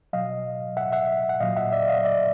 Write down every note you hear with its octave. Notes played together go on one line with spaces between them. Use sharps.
B2 F#3 D#5 F5
E5 F#5
E5 F#5
F#5
A#2 F#3 D#5 F5
E5 F#5
D5 E5
D#5 F5
D5 E5